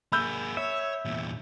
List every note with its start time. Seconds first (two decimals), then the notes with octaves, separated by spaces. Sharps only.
0.12 A#3 G#4 B5 E6 G6
0.57 C#5 E5
1.05 E2 A#2